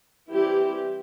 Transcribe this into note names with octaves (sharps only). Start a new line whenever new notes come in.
E3 G3 C4 E4 G4